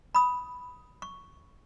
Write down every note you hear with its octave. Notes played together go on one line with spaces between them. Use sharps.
B5 D#6
C#6